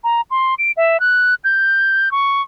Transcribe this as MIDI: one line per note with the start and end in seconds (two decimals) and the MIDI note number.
0.04 0.21 82
0.31 0.54 84
0.58 0.72 98
0.77 1.00 76
1.00 1.35 90
1.44 2.11 91
2.11 2.42 85